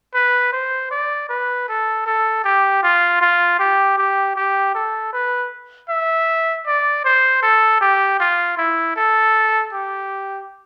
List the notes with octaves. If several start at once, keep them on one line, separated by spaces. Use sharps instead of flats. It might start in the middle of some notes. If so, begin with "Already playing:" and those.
B4
C5
D5
B4
A4
A4
G4
F4
F4
G4
G4
G4
A4
B4
E5
D5
C5
A4
G4
F4
E4
A4
G4